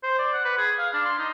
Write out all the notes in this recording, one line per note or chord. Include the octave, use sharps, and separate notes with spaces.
C5
D5
F#5
B4
G#4
F5
D4
C6
D#4